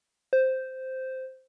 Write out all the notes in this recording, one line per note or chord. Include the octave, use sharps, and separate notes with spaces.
C5